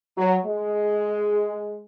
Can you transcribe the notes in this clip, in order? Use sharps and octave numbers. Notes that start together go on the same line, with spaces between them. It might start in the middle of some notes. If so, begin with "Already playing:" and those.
F#3
G#3